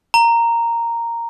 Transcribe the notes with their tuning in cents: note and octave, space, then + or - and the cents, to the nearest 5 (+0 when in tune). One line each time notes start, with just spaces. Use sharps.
A#5 -5